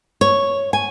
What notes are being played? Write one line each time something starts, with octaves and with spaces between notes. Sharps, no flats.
C#5
G#5